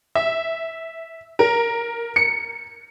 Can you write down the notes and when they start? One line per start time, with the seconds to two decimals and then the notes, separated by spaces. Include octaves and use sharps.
0.15 E5
1.39 A#4
2.16 C#7